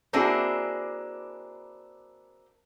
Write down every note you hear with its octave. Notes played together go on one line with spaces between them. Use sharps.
A#3 C4 D4 E4 F#4 G#4